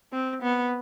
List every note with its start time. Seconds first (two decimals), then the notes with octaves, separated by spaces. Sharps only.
0.13 C4
0.42 B3